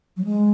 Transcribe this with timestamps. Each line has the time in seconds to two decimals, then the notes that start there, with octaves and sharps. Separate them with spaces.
0.17 F#3
0.25 G#3